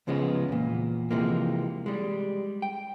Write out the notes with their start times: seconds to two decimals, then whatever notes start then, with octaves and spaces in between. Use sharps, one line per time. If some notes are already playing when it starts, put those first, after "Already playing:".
0.07 C#2 C#3 F3 G#3 B3
0.49 E2 A#2
1.11 C3 E3 F3 G#3 A#3
1.86 G3 G#3
2.62 G5